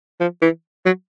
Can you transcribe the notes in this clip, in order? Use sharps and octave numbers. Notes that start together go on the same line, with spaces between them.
F3
E3
F#3